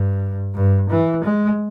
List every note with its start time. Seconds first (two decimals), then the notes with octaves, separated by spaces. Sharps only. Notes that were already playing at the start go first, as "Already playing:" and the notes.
Already playing: G2
0.55 G2
0.90 E3
1.24 G#3